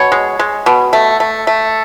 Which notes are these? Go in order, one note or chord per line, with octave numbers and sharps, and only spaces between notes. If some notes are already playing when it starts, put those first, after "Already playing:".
Already playing: B2 C#5
G#3
G#3
B2
A3
A3
A3